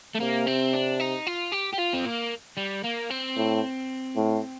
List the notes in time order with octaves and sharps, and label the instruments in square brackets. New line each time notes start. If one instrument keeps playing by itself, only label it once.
[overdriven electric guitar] A3
[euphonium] C3 [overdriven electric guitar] A#3
[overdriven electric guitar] C4
D4
D#4
F4
G4
G4
F4
C4
A#3
G3
A#3
C4
[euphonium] A2
A2